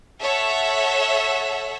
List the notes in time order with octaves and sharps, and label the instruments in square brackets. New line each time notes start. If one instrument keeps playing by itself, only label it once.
[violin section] A4 C#5 E5 F#5